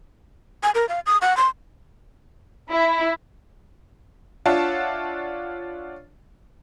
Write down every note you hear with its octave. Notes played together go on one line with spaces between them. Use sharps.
G#5
A#4
F5
D#6
F#5
C6
E4
D4 F4 C#5 E5 F#5 A5